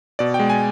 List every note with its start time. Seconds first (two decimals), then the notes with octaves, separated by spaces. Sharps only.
0.19 B2 D5
0.34 G5
0.39 G#3
0.50 G#5